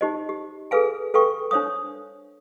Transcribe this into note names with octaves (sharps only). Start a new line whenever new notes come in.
D#4 G4 C5 D#5
G4
G#4 A4 B4 F5 G#5
A4 B4 F5 G5 C#6
D4 C5 C#5 F5 D#6